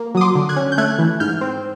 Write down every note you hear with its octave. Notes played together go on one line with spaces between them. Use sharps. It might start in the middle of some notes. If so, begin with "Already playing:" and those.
Already playing: A#3
F#3 D#6
C6 D6
D3
F#6 G#6
C#4
G6
A3 F#6 G#6
E3
G#2 F6 G6
C4